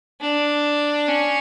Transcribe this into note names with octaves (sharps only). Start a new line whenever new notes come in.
D4
C#4